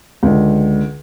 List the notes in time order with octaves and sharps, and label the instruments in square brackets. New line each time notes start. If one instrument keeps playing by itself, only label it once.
[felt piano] C#2 D3